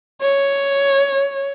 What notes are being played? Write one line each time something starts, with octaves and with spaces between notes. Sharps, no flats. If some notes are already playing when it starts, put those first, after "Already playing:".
C#5